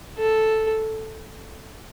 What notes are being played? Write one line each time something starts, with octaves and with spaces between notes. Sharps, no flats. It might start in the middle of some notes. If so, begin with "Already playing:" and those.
A4